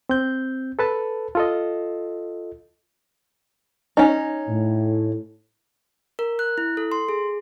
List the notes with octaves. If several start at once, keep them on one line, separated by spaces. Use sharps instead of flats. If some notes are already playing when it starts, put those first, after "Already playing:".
C4 G6
A4 B4 A5
F4 A4 D#5
C#4 D#4
A2
A#4
F#6
E4
A4
C6
G#4